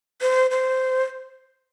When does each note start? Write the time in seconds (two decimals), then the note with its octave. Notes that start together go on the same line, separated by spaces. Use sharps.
0.21 C5
0.51 C5